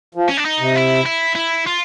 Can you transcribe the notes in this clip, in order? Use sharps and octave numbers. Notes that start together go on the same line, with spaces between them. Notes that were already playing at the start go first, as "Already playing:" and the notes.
F3
C#4
D4
D#4
C3
E4
E4
E4
F4